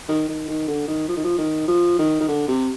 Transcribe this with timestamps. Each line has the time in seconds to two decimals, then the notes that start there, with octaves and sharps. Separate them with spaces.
0.09 D#3
0.29 D#3
0.48 D#3
0.68 D3
0.88 D#3
1.08 F3
1.16 D#3
1.24 F3
1.38 D#3
1.68 F3
1.98 D#3
2.20 D#3
2.28 D3
2.48 C3